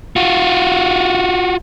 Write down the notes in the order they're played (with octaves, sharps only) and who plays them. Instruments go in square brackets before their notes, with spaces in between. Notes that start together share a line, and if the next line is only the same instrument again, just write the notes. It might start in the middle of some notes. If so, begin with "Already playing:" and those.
[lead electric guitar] F4 F#4